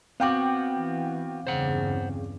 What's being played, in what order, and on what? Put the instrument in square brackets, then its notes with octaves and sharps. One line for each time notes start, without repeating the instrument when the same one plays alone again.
[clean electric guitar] B3 F#4 [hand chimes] C4 [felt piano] F5 G5 D6
[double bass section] E3
[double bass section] E2 G2 C#3 [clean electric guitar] C5 F#5